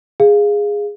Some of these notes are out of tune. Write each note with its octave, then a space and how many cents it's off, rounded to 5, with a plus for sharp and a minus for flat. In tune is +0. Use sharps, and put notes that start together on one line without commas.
G#4 -10 F5 -5